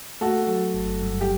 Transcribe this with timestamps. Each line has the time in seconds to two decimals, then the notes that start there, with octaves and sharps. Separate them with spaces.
0.21 A3 F#4 A4
0.47 F#3
0.74 G1
1.02 G2
1.21 G4